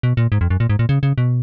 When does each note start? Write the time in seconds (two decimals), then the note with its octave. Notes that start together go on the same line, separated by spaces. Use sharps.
0.03 B2
0.17 A#2
0.32 G#2
0.41 F2
0.50 F#2
0.60 A#2
0.70 G#2
0.79 A#2
0.89 C#3
1.03 C#3
1.18 B2